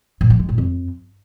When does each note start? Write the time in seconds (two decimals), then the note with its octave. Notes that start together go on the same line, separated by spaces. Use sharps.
0.21 A2
0.30 F#3
0.39 G#3
0.49 A2
0.58 F2